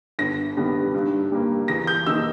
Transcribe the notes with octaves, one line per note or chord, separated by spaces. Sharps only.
G1 A#6
G2 D#3 G3 B3
G2
G3 A#3
E2 A#6
G6
D#3 A#3 D#4 E6